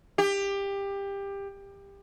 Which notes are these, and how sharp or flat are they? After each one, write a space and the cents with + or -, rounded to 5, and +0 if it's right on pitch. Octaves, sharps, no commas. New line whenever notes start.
G4 +20